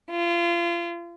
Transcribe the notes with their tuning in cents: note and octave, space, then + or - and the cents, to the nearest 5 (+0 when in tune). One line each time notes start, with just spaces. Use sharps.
F4 -30